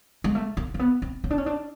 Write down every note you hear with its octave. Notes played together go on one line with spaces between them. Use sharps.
G#3
A3
A#3
A#3
B3
C4
C#4
D4
C#4
D4